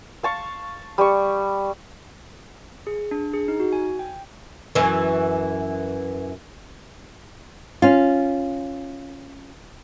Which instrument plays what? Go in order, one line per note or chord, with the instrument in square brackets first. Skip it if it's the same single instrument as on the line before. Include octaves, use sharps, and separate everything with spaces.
[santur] F5 A5 C#6
G3 C#6
[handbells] G#4
D4
G#4
D#4
F#4
G#5
G5
[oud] F#2 E3
[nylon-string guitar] C#4 F4